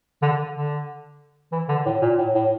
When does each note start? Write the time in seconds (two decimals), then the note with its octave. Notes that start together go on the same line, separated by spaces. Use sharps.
0.22 D3
0.54 D3
1.52 E3
1.69 D3
1.86 A2
2.02 A#2
2.18 A2
2.35 A2